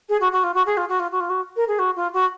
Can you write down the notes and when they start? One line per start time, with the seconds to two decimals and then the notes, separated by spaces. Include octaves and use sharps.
0.09 G#4
0.21 F#4
0.32 F#4
0.44 F4
0.54 F#4
0.66 G#4
0.77 F4
0.89 F#4
1.00 F4
1.11 F#4
1.20 F4
1.30 F#4
1.56 A#4
1.68 G#4
1.79 F#4
1.96 F4
2.14 F#4